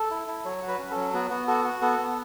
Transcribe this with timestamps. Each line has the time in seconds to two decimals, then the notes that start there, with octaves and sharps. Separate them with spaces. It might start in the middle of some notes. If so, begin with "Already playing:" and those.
Already playing: A4
0.11 E4
0.28 E4
0.45 F#3 C#5
0.62 F#4
0.68 B4
0.79 C#4
0.91 A4
0.96 F#3
1.14 B3 F#4
1.30 B3 F#4
1.47 F#4 A4
1.65 F#4
1.82 B3 A4
1.98 B3